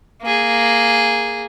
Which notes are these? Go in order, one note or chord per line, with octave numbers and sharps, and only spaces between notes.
A#3 G#4